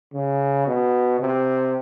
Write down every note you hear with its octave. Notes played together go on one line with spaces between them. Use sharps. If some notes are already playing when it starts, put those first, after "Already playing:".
C#3
B2
C3